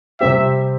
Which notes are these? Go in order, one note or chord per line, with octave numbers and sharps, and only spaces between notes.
C3 G3 C4 G4 E5